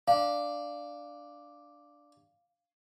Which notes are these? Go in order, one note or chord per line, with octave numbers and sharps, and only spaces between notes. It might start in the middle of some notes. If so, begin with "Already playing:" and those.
D4 F5